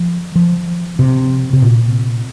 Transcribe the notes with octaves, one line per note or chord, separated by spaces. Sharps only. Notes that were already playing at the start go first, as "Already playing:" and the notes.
Already playing: F3
F3
C3
C3
A#2